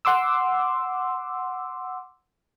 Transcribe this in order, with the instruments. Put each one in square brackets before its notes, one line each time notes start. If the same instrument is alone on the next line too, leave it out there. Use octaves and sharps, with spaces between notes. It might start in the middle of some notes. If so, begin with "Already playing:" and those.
[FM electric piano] F#5 C6 D6 E6